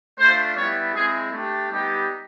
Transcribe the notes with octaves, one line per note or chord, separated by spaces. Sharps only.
A3 D4 F4 C5
G3 B3 E4 G4 C#5
G#3 C4 E4 G#4
A3 D4 G4
G3 B3 D#4 G4